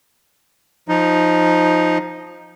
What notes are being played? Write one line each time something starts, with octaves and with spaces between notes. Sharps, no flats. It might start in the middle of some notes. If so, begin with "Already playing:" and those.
F3 D#4